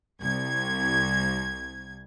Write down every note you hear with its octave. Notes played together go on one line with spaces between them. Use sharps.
C2 G#6